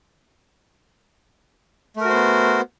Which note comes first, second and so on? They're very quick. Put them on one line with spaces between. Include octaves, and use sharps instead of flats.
A3 A#4 F#4 C5 B3